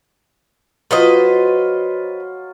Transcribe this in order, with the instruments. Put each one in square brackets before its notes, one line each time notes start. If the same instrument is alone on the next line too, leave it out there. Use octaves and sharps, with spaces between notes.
[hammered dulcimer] F#3 F4 [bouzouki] B4 C5 D#5